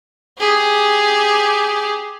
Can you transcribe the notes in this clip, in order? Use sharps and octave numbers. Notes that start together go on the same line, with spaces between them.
G4 G#4